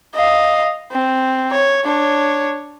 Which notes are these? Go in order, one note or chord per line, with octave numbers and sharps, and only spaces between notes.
D#5 F5
C4
C#5
D4 C#5